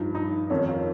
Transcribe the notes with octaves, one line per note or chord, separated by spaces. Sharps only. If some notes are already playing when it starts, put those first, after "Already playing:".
Already playing: G2 F3 D#4
D#4
F2 D#3 C#4
F4